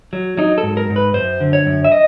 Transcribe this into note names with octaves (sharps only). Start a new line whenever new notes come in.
F#3
F#3 D#4
A4
G#2
A#4
G#2
B4
F#2 C5
D3
C#5
F#2
E5
D#5